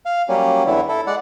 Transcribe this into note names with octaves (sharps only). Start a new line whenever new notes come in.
F5
F#3 G3 A#3 C#4
E2 D3 E3 E4
E4 A4
G#3 D5 F#5